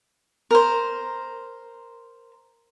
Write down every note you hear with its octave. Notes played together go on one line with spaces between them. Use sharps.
A#4 C5